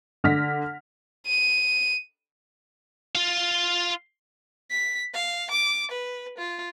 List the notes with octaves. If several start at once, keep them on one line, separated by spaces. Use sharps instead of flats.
D3 F6 A#6 B6
D#7
F4 F5
B6
F5
D6
B4
F4